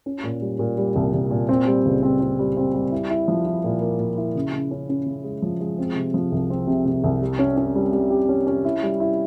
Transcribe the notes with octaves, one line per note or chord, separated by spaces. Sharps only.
C#4
A#2
G3
A#2
G3
C2
C2
A#2
C4
G3
C#2
C4
C4
G3
C4
G3
E4
E4
F3
E4
A#2
A#3
A#2
E4
C#3
C#3
C#4
C#4
C#3
G#3
F3
G#3
C4
C3
F3
C2
C4
C3
C3
C2
G3
C#4
C#4
G3
G3
G4
C#4
C#4
E4
G3
E4